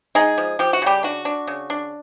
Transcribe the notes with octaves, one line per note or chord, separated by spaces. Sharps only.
G#3 D#4 G#4
F3
F3 G4
F#4
C#3 G3 G4
D4 F#4
D4
C#3
D4